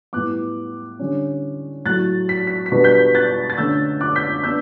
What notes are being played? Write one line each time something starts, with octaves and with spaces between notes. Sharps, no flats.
A2 G3 B3 D6 F#6
D3 G3 C#4
A2 F#3 A3 F#6 A6
B6
B6
B6
B2 G3 B3 D4
G6 B6
F#6 A6
A6
D3 A3 C#4 E6 G6
D6 F#6
G6 B6
B3 D4 E6 G6